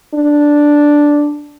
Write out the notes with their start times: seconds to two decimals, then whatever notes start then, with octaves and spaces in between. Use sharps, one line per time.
0.15 D4